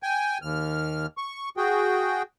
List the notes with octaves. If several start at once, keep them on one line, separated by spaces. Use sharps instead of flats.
G5 G#5
D#2 F6
C#6
F#4 G#4 G5